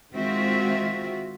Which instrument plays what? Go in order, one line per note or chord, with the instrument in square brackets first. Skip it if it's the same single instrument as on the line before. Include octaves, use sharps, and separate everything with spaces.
[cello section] D#3 G#3 C4 F4 F#4 E5